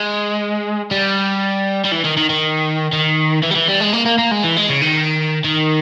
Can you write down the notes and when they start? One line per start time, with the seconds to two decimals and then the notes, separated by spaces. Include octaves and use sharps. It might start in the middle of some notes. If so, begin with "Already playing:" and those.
Already playing: G#3
0.91 G3
1.85 G3
1.92 E3
2.05 D#3
2.17 D#3
2.30 D#3
2.93 D#3
3.43 E3
3.51 G3
3.56 E3
3.68 G3
3.81 G#3
3.93 A#3
4.06 A#3
4.18 A#3
4.31 G#3
4.44 E3
4.57 G#3
4.69 C#3
4.82 D#3
5.44 D#3